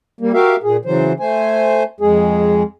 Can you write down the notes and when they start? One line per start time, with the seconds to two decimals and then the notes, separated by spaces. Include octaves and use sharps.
0.21 G3 A#3
0.33 F#4 G4 A#4 E5 F5
0.63 A#2 G#4
0.85 C#3 E3 F#3 C5
1.20 A3 C5 G#5
2.00 F2 G#3 G#4